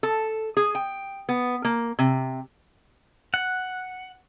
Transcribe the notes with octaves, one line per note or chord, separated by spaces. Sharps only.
A4
G#4
G5
B3
A#3
C3
F#5